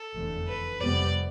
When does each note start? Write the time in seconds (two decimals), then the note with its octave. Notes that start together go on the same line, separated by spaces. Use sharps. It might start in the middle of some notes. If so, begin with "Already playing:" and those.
Already playing: A4
0.15 F1 E2 D3 A3
0.48 B4
0.81 F2 C3 G3 B3 D5